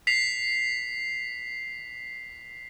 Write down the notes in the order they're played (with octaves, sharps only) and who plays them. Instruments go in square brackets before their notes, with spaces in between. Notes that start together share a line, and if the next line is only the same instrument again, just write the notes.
[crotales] B6 C7 F7